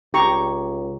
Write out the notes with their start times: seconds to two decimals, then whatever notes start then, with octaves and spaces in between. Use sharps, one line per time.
0.14 C#2 G4 A#5 C#6